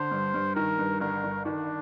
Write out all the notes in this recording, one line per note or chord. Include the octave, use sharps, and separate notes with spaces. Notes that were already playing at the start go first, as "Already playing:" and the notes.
Already playing: D3 C5
G2
G2
D#3 A#4
G2
G1 A#4
G1
D#3 D4